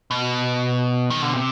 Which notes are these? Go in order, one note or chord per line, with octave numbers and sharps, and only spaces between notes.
B2
D#3
D3
C3